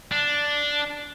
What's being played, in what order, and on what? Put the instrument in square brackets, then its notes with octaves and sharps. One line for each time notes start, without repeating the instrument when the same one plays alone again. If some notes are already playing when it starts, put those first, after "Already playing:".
[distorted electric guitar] D4